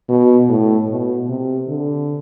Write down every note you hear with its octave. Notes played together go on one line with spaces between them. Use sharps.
B2
A2
B2
C3
D3